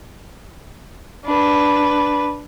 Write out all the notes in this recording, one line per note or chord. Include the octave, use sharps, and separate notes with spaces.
D4 B4